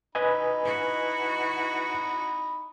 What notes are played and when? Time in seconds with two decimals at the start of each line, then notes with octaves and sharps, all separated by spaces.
0.15 D#4 B4 D#5 G#5 B5
0.62 E4 F#4